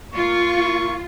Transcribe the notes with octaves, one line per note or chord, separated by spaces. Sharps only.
A#3 F4 C#6